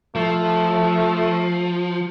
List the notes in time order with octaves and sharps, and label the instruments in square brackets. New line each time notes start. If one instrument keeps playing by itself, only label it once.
[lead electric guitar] F3 [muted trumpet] A3